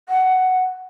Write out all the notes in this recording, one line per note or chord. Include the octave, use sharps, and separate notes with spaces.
F#5